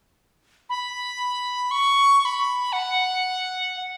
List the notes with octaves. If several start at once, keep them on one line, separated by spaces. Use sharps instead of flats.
B5
C#6
C#6
B5
F#5